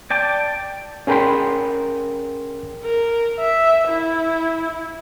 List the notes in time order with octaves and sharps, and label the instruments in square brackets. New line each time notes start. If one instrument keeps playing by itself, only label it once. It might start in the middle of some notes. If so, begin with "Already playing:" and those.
[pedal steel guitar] D5 G5 A5 D6
[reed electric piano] C#4 G#4 A#4 G5 B5 C6
[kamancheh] A#4
E5
E4